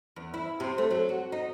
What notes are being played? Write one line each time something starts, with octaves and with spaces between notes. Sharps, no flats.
E2
E4
C3
A3
F#3
F#4
D#4